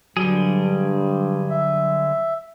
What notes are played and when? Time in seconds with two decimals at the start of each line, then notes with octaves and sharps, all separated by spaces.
0.17 G2 D3 F#3 G3 G#4
1.50 E5